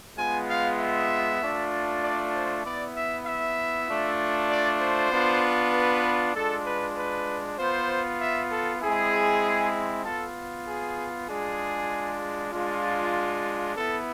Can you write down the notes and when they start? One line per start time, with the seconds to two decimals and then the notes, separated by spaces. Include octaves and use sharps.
0.17 G#3 B3 F4 G#5
0.49 F5
0.79 E5
1.41 A3 D4 F4
2.02 D5
2.34 C5
2.65 B3 E4 D5
2.96 E5
3.26 E5
3.89 A3 D4 F4
4.50 D5
4.81 C5
5.11 B3 D4 F4
5.73 B4
6.35 G#3 D4 F4 A4
6.65 B4
6.97 B4
7.59 B3 F4 C5
8.21 E5
8.51 A4
8.82 G#3 C4 E4 G#4
10.05 B3 F4 A4
10.66 G#4
11.28 G#3 D4 F4 G#4
12.52 G#3 D4 F4
13.75 B3 E4 A4